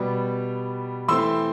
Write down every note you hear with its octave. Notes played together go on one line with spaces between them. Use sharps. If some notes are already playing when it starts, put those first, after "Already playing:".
Already playing: B2 G3 B3
E3 A3 C4 C6 E6